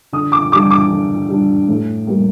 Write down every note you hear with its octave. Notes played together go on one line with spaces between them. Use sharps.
D3 D#6
D6
G3 D4 D6
D6
D3
G3 D4
A2
G3 A#3